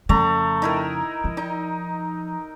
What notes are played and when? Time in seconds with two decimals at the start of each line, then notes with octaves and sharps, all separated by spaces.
0.09 F2 C#3 A3 A#5
0.62 D#4 E4 A#4
1.24 F3
1.37 D#4